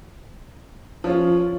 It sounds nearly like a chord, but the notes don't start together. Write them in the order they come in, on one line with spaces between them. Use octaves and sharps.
F3 C#4 F4